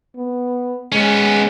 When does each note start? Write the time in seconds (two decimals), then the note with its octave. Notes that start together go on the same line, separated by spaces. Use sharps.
0.16 B3
0.92 G#3 B3 C#4